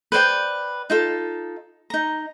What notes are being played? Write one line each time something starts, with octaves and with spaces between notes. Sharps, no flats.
B4 C5 D5 G5
D#4 F4 A4
D#4 A#5